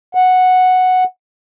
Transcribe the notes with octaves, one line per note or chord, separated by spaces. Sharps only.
F#5